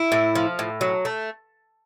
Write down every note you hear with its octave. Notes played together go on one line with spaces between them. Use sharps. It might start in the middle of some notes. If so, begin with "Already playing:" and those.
Already playing: E4
A2
F3
A2
F#3
A3